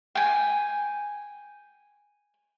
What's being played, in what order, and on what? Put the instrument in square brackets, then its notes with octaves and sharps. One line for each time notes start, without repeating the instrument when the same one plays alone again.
[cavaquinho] G5 G#5